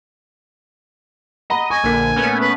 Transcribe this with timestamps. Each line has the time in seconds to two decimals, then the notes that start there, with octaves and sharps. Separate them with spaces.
1.50 D#5 F#5 A#5 B5
1.70 G#5 C#6
1.83 A#1 A#2 D3 A#4 B6
2.16 A3 B3 C#4
2.41 B4